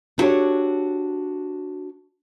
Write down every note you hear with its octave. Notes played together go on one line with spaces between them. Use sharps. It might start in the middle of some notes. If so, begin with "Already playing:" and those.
B3 D4 F#4 G4 A4 C#5